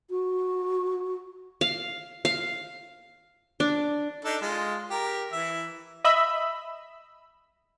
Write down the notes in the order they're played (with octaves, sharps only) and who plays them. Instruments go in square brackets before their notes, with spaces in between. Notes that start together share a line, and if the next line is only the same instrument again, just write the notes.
[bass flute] F#4
[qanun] F5
F5
D4
[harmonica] D4 D#4 A4
G#3 F4
G4 A#4
E3 E5
[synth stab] D#5 E5 B5 E6